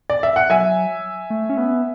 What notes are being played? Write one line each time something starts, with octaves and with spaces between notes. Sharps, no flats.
D5
E5
F#5
F#3 E5 G#5
A3
C#4
B3